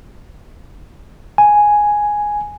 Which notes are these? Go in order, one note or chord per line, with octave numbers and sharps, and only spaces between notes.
G#5